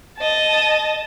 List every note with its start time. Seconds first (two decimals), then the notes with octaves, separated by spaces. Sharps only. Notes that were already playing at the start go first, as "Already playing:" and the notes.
0.19 D#5 A5